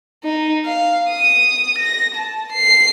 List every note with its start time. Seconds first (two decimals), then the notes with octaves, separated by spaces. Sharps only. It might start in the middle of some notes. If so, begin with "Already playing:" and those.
0.24 D#4
0.65 F5
1.09 D#6
1.79 A#6
2.15 A5
2.53 C7